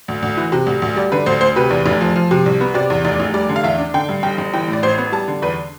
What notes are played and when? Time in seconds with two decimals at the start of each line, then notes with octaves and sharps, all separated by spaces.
0.08 D2
0.22 D2
0.37 E3
0.52 C3
0.66 D2
0.82 D2
0.96 G3 D5
1.12 D3 B4
1.26 D2 C5
1.41 D2 C5
1.56 C3 B4
1.70 E2
1.86 F1
2.01 F3
2.16 F3
2.31 C3
2.46 C2
2.61 B3
2.74 C3 D5
2.90 E2
3.05 F1 D5
3.20 F1
3.34 G3 D5
3.49 D3
3.56 F5
3.63 E2 E5
3.78 D4
3.94 D3 G5
4.09 G2
4.23 G1 G5
4.38 G1
4.53 E3 G5
4.67 A2
4.73 D5
4.83 A1 C5
4.98 B3
5.12 G3 A5
5.28 D3
5.42 E2 B4